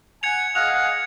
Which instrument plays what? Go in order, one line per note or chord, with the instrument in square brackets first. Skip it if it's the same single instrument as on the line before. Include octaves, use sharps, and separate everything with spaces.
[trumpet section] F#5 G#5 [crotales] G#6 C#7 F7
[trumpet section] G#4 D#5 F5 [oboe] F#5 [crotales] F7